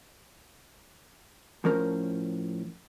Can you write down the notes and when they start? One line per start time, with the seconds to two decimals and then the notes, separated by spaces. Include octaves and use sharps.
1.64 A2 F3 C#4 A#4 C5